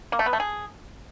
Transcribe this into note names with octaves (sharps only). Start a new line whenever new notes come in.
A#3
A3
B3
A3
G#4